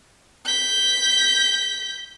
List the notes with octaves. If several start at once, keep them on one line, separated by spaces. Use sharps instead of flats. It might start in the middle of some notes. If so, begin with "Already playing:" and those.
G6 B6